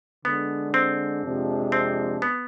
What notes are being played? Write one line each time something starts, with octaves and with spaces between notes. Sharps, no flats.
D3 G#3 B3 D4
C4
F2 C3 F3 G#3 D4
C4
B3